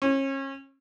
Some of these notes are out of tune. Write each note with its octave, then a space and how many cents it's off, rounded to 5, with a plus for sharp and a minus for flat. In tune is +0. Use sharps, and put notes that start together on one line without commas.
C#4 -35